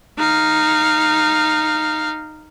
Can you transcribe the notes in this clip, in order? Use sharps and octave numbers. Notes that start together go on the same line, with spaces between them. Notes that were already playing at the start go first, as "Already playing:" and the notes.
D#4 F5